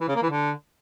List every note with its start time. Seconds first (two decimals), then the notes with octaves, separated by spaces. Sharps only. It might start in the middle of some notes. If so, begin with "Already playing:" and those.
0.01 E3
0.08 C#3
0.15 A#3
0.23 E3
0.30 D3